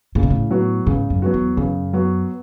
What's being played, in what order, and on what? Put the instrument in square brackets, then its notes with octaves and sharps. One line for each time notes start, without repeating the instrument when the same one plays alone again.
[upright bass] A2 [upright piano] C#3
[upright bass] B2
A2
[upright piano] F#3 B3 F#4
[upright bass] G#2 [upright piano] C#3
[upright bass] F#2
[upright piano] F#3 B3 F#4
[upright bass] E2
[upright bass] F#2 [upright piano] C#3
[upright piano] F#3 B3 F#4